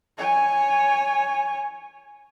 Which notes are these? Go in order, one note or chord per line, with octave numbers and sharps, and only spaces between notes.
C#5 G#5